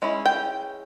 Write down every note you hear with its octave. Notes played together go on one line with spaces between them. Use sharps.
G#3 C#4 E4
G5